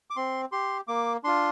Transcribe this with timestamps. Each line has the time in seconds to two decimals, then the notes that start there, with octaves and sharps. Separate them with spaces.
0.10 D6
0.16 C4 C6
0.52 G4 C6
0.88 A#3 D6
1.24 D4 F4 C6